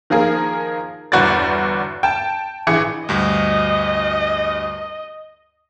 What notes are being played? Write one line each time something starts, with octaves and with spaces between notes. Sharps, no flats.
D#3 F3 A#3 G#4 A#4
G1 E2 F#4 B4 D5 A6
G5 A5
A#1 E3 G#4 D6 C#7
D2 G2 D#5